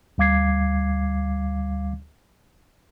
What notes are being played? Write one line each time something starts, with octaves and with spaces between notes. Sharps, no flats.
D2 G3 F5 D6 G#6 C7